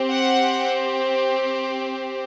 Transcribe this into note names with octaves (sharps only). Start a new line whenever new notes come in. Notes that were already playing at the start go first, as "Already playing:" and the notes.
Already playing: C4 G4
F#5